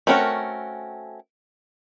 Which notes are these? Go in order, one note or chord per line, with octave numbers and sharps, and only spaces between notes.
A3 C4 C#4 F#4 A#4